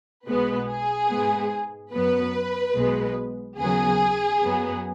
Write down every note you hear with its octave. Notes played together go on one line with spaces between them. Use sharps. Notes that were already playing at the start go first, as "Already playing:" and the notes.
B1 B2 G#3 B3 B4
G#4
G#2 G#3 B3
F#2 F#3 B3 B4
B1 B2 G#3 B3
D#2 C#3 F#3 B3 G#4
F#2 F#3 B3